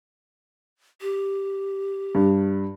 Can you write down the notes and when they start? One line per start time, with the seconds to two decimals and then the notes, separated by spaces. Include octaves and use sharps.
1.02 G4
2.15 G2